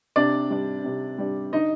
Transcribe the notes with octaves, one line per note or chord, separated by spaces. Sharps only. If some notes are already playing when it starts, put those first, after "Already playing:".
C3 D4 D5
G3 D4
C3
G3 D4
D3 D#4 D#5